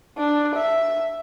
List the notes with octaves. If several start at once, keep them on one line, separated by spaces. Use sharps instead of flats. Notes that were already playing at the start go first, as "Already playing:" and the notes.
D4
E5